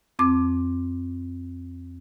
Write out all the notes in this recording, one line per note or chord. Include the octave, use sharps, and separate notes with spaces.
F2 C4 D6